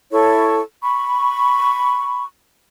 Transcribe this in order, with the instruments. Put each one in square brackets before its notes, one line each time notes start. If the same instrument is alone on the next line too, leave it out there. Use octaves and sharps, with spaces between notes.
[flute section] E4 A4 C#5 C#6
B5 C#6